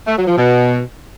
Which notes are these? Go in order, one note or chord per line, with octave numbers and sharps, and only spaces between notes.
A3
F#3
F3
B2